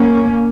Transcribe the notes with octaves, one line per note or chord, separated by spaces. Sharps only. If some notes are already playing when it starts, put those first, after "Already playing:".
Already playing: A#3 C#4